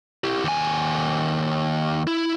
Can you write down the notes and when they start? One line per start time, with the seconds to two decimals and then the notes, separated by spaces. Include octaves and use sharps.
0.24 E4 G4
0.44 D#2 G#5
2.07 E4